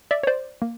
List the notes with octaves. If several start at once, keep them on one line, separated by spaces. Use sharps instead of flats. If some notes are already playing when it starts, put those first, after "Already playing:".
D5 E5
C#5
C5 D5
A#3